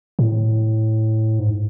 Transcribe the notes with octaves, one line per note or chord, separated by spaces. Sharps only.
A2
G#2